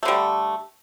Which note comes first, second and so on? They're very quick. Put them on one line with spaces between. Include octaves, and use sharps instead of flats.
A3 D3 G3